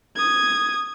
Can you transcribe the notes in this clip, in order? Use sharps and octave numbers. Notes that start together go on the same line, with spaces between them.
D#6 G#6